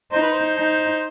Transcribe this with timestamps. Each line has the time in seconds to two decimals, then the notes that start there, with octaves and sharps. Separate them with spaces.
0.12 D#4 C5
0.22 B4
0.32 C5
0.57 D#4